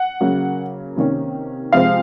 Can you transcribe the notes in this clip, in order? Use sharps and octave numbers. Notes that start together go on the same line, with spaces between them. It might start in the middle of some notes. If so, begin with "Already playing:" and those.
Already playing: F#5
C#3 F#3 A#3
C3 D#3 A#3 C#4
C3 F3 G#3 C4 F5